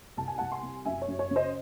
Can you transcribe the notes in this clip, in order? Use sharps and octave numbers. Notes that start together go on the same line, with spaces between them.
C2 A5
G#5
C2 F#5 A5
G#5 C6
C3
F#2 E5 G#5
C#5
F#2
C#5
C#3
C5 D#5